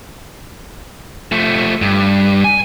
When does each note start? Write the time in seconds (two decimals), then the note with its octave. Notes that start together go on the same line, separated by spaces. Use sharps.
1.32 F3 A3
1.82 G2
2.44 G#5